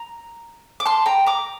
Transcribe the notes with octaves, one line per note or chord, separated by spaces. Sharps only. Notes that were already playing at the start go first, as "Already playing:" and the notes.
Already playing: A#5
D6
A5 C6
G5 A#5
A#5 D6